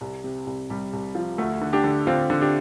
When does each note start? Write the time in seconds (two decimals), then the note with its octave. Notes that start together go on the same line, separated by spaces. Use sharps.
0.01 C2
0.24 C3
0.46 C2
0.70 C2 G3
0.93 C2
1.15 F3
1.38 D2 A3
1.61 D3
1.73 D4 G4
1.84 D3
2.07 D3 C4 F4
2.30 D3
2.41 D4 G4